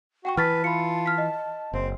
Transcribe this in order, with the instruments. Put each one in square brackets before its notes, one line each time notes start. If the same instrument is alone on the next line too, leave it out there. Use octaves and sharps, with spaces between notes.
[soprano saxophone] F#4 [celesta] F#5 G5 C#6
[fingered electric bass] E3 [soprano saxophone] B4 [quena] A5 [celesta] F6 A6 B6
[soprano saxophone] F4 [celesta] B5 C#7
[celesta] F6 B6
D#5
[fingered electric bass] F#1 [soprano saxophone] C4